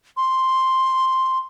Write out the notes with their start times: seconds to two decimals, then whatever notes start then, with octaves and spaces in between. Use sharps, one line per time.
0.17 C6